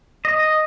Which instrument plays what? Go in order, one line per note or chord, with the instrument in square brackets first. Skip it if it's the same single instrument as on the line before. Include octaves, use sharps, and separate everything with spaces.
[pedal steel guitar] D#5